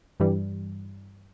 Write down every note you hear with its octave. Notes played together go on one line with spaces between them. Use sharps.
G2 E3 G3